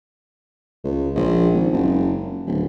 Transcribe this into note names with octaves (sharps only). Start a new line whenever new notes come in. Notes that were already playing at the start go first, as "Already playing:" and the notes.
C#2
A#1
G#1
F#1
D1